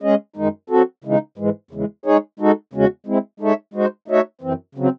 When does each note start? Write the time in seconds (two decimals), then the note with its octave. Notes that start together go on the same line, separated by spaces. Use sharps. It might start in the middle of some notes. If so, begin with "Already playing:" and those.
0.02 G#3 C#4 G#4 D#5
0.36 F#2 D#3 G#3 D#4
0.70 F#3 C4 F#4 A4
1.04 C#3 E3 G#3 D#4
1.38 G#2 E3 G#3
1.71 E2 C#3 E3 G#3
2.06 G#3 D#4 G#4 C#5
2.40 G#3 D#4 F#4 A4
2.73 E2 C#3 G#3 C#4 F#4
3.07 G#3 C4 E4
3.40 G#3 D#4 A4 C#5 E5
3.74 G#3 D#4 F#4 C5
4.08 A3 D#4 F#4 C#5 E5
4.41 F#2 E3 C4
4.75 C#3 F#3 C4